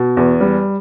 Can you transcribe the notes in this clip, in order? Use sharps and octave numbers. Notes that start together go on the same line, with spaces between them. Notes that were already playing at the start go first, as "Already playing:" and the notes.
Already playing: B2
E2
G3